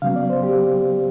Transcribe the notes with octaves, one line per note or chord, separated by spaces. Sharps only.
C#3 F#3 B3 F5
D5
C5
G4